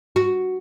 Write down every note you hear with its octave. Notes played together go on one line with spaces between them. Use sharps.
F#4